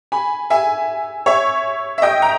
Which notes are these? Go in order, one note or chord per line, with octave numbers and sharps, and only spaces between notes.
G#5 B5
E5 G#5
C#5 E5
E5
D#5 G5
G5 A#5